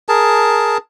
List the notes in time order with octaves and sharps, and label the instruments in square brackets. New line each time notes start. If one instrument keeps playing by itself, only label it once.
[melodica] G#4 A#4 A5